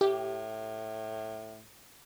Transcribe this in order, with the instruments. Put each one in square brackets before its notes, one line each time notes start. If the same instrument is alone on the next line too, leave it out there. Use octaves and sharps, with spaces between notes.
[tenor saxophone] A2 [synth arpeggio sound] G4